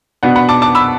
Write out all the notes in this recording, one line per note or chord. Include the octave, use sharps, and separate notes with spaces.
B2 B3 D4 F#5
F#5 B5
A5 D6
A5 D6
B5 E6